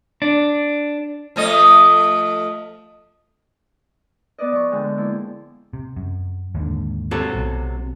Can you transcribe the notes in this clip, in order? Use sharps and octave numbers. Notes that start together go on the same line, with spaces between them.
D4
F3 A3 D#5
B3 B4 D5 D#5
F3 C#6
D3 G#3 G5
F3 A#3 E4
C3
F#2
D#2 G#2 D3
C3 F#3 A4
B1 B2